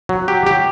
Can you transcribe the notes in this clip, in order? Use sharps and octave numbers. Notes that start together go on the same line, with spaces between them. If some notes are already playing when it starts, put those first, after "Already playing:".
F#3
G4
G4